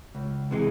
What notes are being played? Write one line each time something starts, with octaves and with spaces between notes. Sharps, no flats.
C#2
C3 E3 G#3